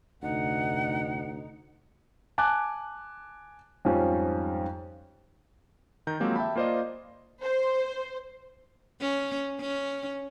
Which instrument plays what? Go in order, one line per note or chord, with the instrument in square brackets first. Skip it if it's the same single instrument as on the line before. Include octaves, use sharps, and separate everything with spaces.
[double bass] F1 D#4 [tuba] D2 [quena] F#5
[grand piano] G#5 A5 D6 F#6
F2 G#2 F3 G3 C#4
[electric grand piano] D#3 A#5 G6
F3 F#3 G#3 A#3 C4 G4
E5 G5 A5 B5
A#3 F4 C5 D5 D#5
[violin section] C5
[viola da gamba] C#4
C#4